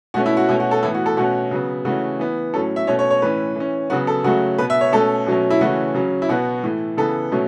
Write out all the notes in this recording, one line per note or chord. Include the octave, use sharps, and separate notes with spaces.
B2 A3 C#4 F#4
E4
F#4
B2 A3 C#4 E4
F#4
A4
A2 E3 B3 E4
F#4
A4
B2 A3 C#4 F#4
C#3 F#3 B3
C#3 E3 A3 C#4 F#4
E3 B3
A2 F#3 C#4 A4
E5
B2 A3 C#4 C#5
C#5
C#5
A2 E3 C#4 B4
E3 C#4
C#3 F#3 B3 F#4
A4
C#3 F#3 A3 C#4 F#4
B2 B3 B4
E5
C#5
B2 A3 C#4 A4
B2 F#3 A3 C#4
E4
C#3 E3 A3 C#4 F#4
C#3 F#3 C#4
E4
B2 B3 F#4
A2 E3 A3
C#3 E3 B3 A4
B2 F#3 A3 C#4